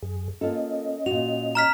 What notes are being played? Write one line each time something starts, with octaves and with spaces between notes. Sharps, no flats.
F#2 G#4
A#3 C#4 F4 A4 D#5
A#2 F#4 F7
A#5 F6 B6